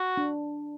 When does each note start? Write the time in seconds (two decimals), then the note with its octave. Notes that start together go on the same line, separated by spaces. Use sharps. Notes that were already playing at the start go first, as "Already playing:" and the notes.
Already playing: F#4
0.17 D4